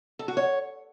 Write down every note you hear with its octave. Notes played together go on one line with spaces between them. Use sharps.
A4
F#4
C#5